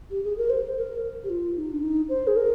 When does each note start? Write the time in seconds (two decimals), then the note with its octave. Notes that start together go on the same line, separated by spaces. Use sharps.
0.10 G4
0.24 G#4
0.37 A#4
0.50 C5
0.77 A#4
1.24 G4
1.29 F4
1.56 D#4
1.71 D4
1.82 D#4
2.09 C5
2.27 G#4
2.36 A#4